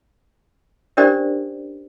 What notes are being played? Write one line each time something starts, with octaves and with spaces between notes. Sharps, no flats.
C#4 D4 G4 A#4 C5 D5